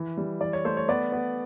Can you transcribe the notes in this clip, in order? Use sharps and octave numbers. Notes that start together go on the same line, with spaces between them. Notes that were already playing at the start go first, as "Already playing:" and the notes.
Already playing: E3 E5
G3
E3 D5
C#5
A3 C5
C#5
B3 D5
B3